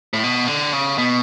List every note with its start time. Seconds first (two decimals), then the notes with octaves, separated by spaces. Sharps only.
0.13 A2
0.23 B2
0.48 D3
0.73 C#3
0.98 B2